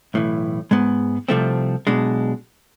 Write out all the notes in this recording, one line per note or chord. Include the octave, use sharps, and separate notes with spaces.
B1 A2 E3
G#2 G#3 B3
C2 C3 F3 A3 C4
B1 B2 G#3 D4